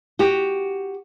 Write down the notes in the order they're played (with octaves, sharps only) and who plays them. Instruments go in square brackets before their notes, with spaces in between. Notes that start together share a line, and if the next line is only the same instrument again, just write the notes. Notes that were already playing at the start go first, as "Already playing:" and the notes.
[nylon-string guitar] F#4 G4